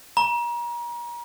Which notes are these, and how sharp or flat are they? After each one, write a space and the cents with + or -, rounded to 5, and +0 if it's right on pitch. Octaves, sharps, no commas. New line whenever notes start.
A#5 +35